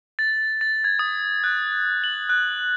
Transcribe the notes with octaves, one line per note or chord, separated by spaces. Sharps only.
A6
A6
G#6
D#6
F#6
F#7
F#6